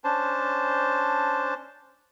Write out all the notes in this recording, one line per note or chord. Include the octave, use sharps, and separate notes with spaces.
C#4 D4 C5 A5